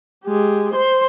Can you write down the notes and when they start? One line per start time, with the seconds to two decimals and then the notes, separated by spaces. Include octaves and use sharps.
0.25 G#3 G4
0.73 C5 C6